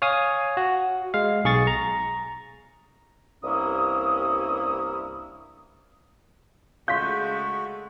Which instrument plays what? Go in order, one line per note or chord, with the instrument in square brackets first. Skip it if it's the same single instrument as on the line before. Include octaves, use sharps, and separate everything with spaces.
[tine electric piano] C#5 F5 G#5 D#6
F#4
G#3 F5
B1 G#4 C#6 A6
A#5
[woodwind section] C2 G2 A#3 C#4 E4 D#6
[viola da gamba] C#3 G#3 A3 [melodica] F#4 [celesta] F5 C6 [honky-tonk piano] G6 B6